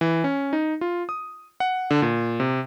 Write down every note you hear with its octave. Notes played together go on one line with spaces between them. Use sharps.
E3
C#4
D#4
F4
D#6
F#5
D3
A#2
C3